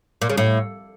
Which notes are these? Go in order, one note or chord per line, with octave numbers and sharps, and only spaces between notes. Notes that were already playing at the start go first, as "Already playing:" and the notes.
A#2
C#3
A2